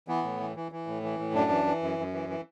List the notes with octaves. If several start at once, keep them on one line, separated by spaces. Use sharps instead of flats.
E3 B3
A2
E3
E3
E3
A2
E3
A2
F#2 D4
E3
E3
F#2
F#2
E3
E3